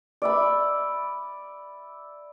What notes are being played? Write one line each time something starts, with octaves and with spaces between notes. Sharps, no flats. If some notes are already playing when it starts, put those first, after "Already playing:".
D5 E5 B5